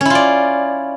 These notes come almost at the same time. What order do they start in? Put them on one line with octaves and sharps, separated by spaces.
C#4 E4 F4 D5